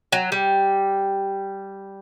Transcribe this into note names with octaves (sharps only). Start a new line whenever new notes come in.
F#3
G3